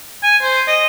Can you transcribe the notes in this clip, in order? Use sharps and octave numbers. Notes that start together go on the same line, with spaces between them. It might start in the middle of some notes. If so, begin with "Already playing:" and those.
G#5
C5
D#5